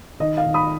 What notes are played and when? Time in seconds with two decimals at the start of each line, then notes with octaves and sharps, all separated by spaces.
0.20 D#3 D#5
0.38 F5
0.46 D#3
0.54 B5 D#6